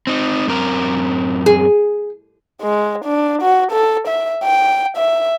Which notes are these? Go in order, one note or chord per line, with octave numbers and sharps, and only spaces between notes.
C4 D#4
F#2 C4 A#4
G#4
G#3
D4
F#4
A4
E5
G5
E5